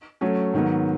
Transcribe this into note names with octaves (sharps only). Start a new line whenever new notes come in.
F#3 A3 C#4
G#2 D#3 F#3 B3